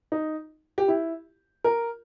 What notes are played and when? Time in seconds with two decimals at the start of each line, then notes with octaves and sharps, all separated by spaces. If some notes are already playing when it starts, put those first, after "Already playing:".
0.12 D#4
0.78 G4
0.88 E4
1.64 A#4